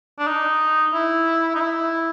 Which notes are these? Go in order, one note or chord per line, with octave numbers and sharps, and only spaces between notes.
D4
D#4
E4
D#4
E4